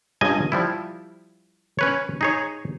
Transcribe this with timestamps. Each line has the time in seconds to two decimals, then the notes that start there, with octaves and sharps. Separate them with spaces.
0.21 C#2 G2 G3 D#5 G#5
0.52 F3 G3 E4
1.79 C#4 B4 C#5
2.21 D#4 G#4 C#5